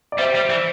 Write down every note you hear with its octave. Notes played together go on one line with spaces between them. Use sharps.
D5
G3 C5 E5
G3
E3